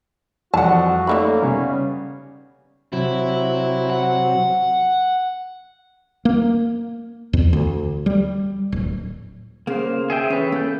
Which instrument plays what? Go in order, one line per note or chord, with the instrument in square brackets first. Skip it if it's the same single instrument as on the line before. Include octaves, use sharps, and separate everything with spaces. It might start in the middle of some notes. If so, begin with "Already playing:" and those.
[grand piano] F2 E3 G3 [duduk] F#4 [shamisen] F#5 A5
[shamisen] D3 A3 B5 [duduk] A#3 [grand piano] C#4 D#4
[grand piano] C#3 G3 B3 [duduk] C#4
[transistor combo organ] C3 F#3 [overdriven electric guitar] E4
[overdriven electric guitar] F#5
[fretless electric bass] A#3
E2
D2
G3
D1
[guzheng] C#3 [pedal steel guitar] A#3 C5
[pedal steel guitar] G#4 E5 G5
[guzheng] E3 A4 [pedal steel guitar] C#4 B4
[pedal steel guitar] A#3 G#4 G6 [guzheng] A4